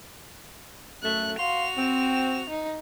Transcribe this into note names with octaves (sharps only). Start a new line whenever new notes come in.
F#2 A3 F#6
F#4 F5 C6 F7
C4
D#4